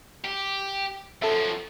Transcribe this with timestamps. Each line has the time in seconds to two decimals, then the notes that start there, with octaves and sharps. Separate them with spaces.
0.24 G4
1.22 F#2 F3 A4 E5